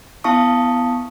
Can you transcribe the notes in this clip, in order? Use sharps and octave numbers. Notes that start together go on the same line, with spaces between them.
B3 E4 F5 A5 C#6 D#6